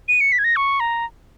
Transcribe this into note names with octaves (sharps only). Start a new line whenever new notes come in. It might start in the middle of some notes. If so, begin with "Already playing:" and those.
D#7
C#7
B6
G#6
A#6
C#6
A#5